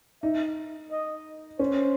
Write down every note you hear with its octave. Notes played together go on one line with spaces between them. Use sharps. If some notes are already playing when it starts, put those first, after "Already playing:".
D#4 E5
D#5
C#4 C5